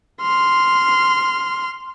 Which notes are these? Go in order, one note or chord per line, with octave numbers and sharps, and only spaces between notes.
C6 F6